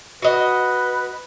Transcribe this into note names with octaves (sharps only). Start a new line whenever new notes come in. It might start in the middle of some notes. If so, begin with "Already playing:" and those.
F#4 B4 D#5